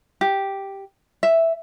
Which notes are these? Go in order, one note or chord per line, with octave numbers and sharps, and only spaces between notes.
G4
E5